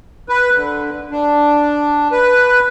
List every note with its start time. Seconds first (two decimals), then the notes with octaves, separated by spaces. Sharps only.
0.29 B4
0.55 D3
1.11 D4
2.12 B4